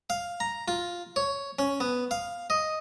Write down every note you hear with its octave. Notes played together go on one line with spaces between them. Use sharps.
F5
A#5
F4
C#5
C#4
B3
F5
D#5